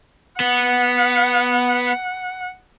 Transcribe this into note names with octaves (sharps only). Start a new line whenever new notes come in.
B3 F#5